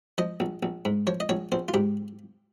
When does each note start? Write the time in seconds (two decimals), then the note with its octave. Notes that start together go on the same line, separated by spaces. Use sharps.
0.18 F3 D#5
0.40 A#1
0.63 A#1
0.85 G#2
1.07 F3 C#5
1.20 D#5
1.29 A#1 C#5
1.52 A#1 C5
1.68 F4
1.74 G#2 G4